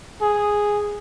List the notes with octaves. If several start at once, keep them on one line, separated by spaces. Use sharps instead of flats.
G#4